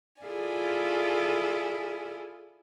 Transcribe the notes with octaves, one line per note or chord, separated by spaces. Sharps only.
E4 F4 G#4 A4 D5 G#5